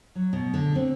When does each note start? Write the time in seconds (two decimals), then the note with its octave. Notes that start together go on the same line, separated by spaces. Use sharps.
0.15 F#3
0.33 B2
0.54 D3
0.75 C4